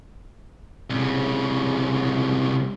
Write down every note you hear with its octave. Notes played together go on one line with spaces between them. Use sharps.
C2 C#3